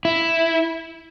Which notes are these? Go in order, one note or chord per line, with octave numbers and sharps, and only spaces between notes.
E4